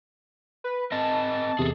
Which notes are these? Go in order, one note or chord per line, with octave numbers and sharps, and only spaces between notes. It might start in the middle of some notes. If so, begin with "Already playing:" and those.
B4
C4 A#4 D#5 A5
E2 C3 G#4 A4